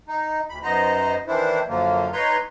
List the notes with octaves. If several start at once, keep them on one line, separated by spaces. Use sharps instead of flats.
D#4
D2 B5
F#2 B3 D#4 C5 D#5 A#5
D#3 E3 D4 E4 C5
F#2 D3 F3 F#3 A#3
D#4 B4 C#5 A#5 C6